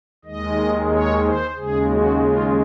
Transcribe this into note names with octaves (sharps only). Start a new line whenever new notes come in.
D#2 D#3 G#3 D#5
C#5
C5
D#2 C#3 G#3 G#4
F#4
F4